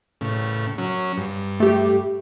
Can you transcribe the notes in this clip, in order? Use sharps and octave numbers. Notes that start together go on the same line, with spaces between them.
A2 C#3
F#3 C#4
G2
A3 G4